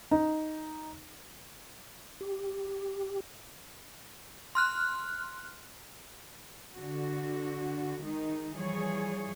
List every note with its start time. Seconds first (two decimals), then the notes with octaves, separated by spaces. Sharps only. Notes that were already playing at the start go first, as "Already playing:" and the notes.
0.11 D#4
2.21 G4
4.55 C6 F6 F#6
6.74 D3 F#4
8.01 D#3 G#3 D#4
8.56 E3 F3 G3 G#4 C#5